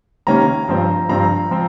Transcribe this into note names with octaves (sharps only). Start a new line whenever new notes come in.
C3 D#3 A#3 C#4 A#5
G2 F3 C4
G2 F3 C4 A#5
F3 C4